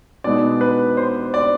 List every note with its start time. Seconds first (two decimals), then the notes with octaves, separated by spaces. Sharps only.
0.24 B2 G#3 B3 D#4 D5
0.61 B4
0.97 C5
1.34 D5